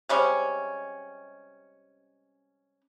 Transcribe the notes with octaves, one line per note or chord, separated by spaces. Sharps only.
C3 G3 G#3 C#4